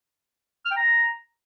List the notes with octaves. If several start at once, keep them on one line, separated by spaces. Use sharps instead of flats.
F6
G5
A#5